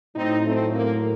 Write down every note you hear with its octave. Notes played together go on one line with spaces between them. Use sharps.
A2 F#3 C4 D#4
A3 C4
A#3